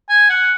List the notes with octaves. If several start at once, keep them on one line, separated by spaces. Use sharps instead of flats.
G#5
F#5